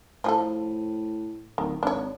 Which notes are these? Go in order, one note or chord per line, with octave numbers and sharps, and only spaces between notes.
A2 F3 G#4 A4
D1 D#3
G#1 D4 C#5